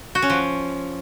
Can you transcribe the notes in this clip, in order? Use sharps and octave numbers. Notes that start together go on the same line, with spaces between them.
F#4
C#4
F3